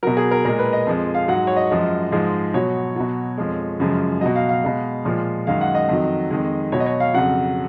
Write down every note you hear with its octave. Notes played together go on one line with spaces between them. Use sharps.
B2 F#3 A#4
G#4
A#4
A#2 G#3 A#4
B4
D#5
F2 F3 G#3
F5
G#2 F#3 F#5
C#5
D#5
F#2 F3 G#3
G#2 F3 G#3
B2 F#3 C#5
B2 F#3
F2 F3 G#3
F#2 C#3 F3 G#3
B2 F#3 D#5
F5
F5
B2 G#3
A#2 F3 G#3
F#2 D#3 G#3 F5
F#5
D#5
F2 D#3 F#3
F2 D#3 G#3
B2 F#3 C#5
D#5
C#5
F5
F2 C#3 F#3 F#5